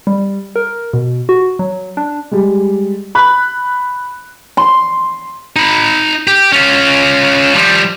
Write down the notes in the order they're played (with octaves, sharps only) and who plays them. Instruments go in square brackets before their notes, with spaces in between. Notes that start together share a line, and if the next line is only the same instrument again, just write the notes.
[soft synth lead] G3
A#4
B2
F#4
F#3
D4
[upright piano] G3 G#3
B5 F#6
[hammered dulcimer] C6
[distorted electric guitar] D#4 B5
G4
C#4 F4
F3 G3